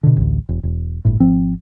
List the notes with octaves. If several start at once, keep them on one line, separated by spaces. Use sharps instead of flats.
B2 D3
A1 D2
E1
E1
G1 A2
G#1 F3 C4